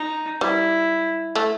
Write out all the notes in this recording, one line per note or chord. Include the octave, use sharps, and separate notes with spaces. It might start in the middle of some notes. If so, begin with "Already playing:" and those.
Already playing: D#4
G3 E4
A3